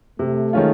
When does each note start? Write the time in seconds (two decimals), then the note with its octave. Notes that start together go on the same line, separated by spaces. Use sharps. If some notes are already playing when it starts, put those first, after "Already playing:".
0.19 C3 A3
0.53 D#3 G#3 C#4 F4